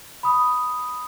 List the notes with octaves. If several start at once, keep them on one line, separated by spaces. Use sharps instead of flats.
B5 D#6